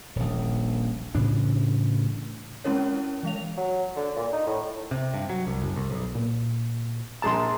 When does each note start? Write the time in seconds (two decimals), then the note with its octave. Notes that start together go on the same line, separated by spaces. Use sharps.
0.16 D#1 A#1
1.15 A2 C#3 E3 D4
2.64 G#3 C4 C#4 E4 A#4 C#5
3.23 E3 G#3 F5 F7
3.58 F#3
3.96 D3
4.16 A#2
4.33 D#4
4.47 A2
4.91 C3
5.14 G2
5.30 F#3
5.47 C2
5.62 F#1
5.76 C2
5.91 B1
6.15 A#2
7.22 A#1 G#4 A5 A#5 C6